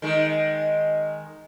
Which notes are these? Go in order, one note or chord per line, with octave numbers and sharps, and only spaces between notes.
D#3 G#3